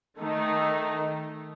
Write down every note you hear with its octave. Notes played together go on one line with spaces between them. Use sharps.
D#3 A3 D#4